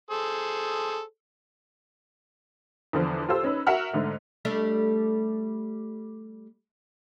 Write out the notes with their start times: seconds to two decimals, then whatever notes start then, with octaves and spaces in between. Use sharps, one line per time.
0.11 G#4 A4 C5
2.93 E2 D3 F3
3.28 F4 G4 A4 C5 E6
3.43 C#4 D#4 B4
3.67 F#4 A#4 E5 F#5 F6
3.93 G#2 D3 A3
4.45 G3 A3 D4